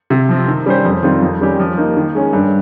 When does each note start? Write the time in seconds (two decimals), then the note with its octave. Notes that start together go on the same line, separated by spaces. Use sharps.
0.10 C3
0.29 F3 C4
0.47 D#3
0.66 G3 C#4 G4 C5
0.85 F2
1.03 D#3 G3 C4 F4
1.22 F2
1.41 D#3 G3 C#4 G4
1.60 F3
1.77 A#3 D#4
1.97 D#3
2.15 G#3 C#4
2.33 G2